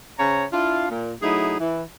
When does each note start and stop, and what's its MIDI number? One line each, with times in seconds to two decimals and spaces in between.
0.19 0.44 49
0.19 0.44 72
0.19 0.44 73
0.19 0.44 82
0.52 0.88 62
0.52 0.88 64
0.52 0.88 65
0.90 1.14 46
1.22 1.58 54
1.22 1.58 57
1.22 1.58 63
1.22 1.58 64
1.22 1.58 68
1.59 1.83 52